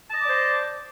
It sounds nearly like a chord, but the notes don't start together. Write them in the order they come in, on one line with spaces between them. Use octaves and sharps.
A5 D#5 D6 D5 C5